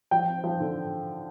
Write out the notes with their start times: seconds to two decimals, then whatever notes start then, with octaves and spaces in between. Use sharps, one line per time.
0.11 F3 G5
0.28 C4
0.44 F3
0.60 D3